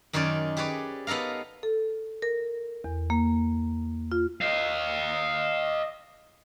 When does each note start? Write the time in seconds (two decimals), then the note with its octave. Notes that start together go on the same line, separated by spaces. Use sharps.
0.13 F#2 D#3 D#4 C#5 D5
0.57 G4 G#4 B4 C#5 D5
1.07 B3 D#4 A4 A#4 F5
1.63 A4
2.22 A#4
2.84 E2
3.10 A#3
4.11 F4
4.41 D#5 F5